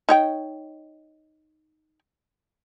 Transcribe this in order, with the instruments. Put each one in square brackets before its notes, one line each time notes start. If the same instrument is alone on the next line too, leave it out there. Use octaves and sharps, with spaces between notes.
[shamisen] D#4 C#5 G5